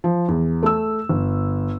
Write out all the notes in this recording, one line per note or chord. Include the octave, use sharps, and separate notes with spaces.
F3
E2
A3 E6
G1